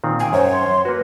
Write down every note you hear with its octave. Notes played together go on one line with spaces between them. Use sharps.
A#2 D#3 C4
G5 G#5
F#2 C5 C#5
C6
A#3 F#4 B4